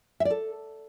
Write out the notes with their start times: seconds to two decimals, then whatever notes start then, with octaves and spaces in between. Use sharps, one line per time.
0.20 E5
0.25 D5
0.30 A4